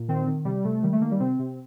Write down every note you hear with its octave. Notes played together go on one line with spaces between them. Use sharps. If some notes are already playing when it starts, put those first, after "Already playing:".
Already playing: A#2
D#3 C4
D#3
C3 G3
C3 A3
D#3 G3
A3
D#3 A#3
G3
C3 C4
C3